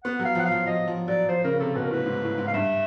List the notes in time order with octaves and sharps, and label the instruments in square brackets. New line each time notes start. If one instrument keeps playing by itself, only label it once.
[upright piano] B3 [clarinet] F#5
[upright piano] F#3
[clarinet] F5
[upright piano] F3 [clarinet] F#5
[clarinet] F5
[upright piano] F3
[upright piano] F3 [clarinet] D#5
[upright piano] F3
[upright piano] F#3 [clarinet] D5
[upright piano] F3 [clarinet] C5
[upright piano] C#3 [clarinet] A#4
[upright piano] C3 [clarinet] A4
[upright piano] B2 [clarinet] B4
[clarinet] A#4
[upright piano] A2 [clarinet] B4
[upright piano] G#2
A2
G#2
[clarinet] F5
[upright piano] G2 [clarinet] E5